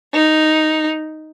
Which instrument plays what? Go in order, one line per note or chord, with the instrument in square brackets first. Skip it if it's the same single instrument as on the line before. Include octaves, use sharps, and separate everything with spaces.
[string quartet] D#4